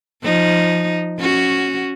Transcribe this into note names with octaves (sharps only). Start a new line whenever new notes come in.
F3 D#4
C#4 F#4